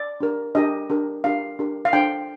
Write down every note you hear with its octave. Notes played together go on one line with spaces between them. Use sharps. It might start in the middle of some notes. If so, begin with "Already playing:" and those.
Already playing: D5
D4 G4 A#4
D4 G4 A#4 D#5
D4 G4 A#4
D4 G4 A#4 F5
D4 G4 A#4
F5
D4 A4 C5 G5